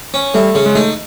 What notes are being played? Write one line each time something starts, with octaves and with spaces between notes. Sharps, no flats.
C#4
G3 A3
C#3
G#3
A3 D#4